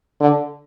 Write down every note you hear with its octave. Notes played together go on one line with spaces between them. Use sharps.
D3